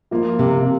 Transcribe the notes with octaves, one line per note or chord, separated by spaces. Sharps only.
F3 A#3 F4
C3